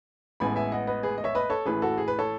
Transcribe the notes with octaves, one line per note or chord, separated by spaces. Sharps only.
A1 A2 G#3 B3 G#5 B5
E5 G#5
D#5 F#5
B4 D#5
G#4 B4
D#5
C#5 E5
B4 D#5
A4 C#5
A1 A2 E3 G#4 B4
F#4 A4
G#4
B4
A4 C#5